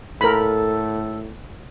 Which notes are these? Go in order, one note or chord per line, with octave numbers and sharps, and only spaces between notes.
A2 A4 A#4 B5